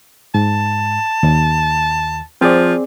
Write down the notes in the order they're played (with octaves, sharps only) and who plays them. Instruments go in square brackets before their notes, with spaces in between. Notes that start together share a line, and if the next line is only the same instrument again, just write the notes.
[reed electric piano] G#2 [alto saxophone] A5
[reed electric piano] D#2
[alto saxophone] F3 [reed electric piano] C4 G#4 D5